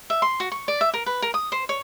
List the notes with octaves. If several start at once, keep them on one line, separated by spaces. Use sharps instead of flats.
E5
C6
F#4
C#6
D5
E5
A#4
B4
A#4
D#6
C5
C#5